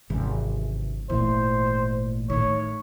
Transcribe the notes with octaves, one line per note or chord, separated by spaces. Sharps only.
G#1 C3 E3 C#4
G#1 A#2 E3 A3 C5
A2 D#3 C#5